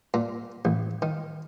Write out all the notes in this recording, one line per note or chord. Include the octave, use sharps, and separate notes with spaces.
A#2
A1
D#3